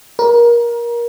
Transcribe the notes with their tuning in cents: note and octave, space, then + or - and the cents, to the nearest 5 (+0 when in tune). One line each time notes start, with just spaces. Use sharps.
A#4 +25